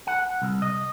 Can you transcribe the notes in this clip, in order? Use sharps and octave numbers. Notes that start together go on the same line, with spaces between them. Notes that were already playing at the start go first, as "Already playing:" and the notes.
F#5
C2
D#5